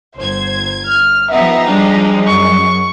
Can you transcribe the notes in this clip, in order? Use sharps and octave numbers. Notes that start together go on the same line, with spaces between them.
G1 C5 G#6
F6
F3 B3 D#4 G4 E5
G3 G#3 D4
F#2 C#6